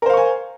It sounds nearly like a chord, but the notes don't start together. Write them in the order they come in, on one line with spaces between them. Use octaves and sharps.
A#4 C5 F5 C#6 G#5